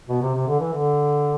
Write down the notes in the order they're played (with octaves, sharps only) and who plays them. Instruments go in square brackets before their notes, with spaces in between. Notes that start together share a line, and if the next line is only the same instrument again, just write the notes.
[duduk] B2
C3
C3
D3
E3
D3